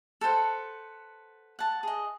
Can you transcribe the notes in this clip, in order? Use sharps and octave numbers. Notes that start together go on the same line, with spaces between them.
A4 B4 C5 F#5
F#5 A5
G#4 D#5